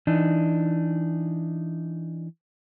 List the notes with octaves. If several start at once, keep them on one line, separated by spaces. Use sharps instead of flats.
E3 D4 D#4